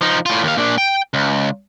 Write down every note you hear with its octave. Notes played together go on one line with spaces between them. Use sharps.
F3 D#4
A2 F4
D#2 F5
A#2 D4
G5
C#2